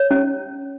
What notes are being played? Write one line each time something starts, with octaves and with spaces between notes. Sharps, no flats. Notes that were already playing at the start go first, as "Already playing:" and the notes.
Already playing: C#5
C#4